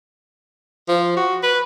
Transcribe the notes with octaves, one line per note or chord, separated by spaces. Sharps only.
F3
F#4
B4